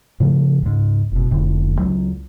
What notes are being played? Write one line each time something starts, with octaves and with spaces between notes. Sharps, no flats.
A2 C#3 F3
C#2 G#2
F#1 B2
F1 A2 D3
C#2 F#3